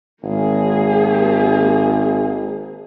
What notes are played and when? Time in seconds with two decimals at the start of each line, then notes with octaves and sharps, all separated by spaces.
0.23 G#1 A#3 G#4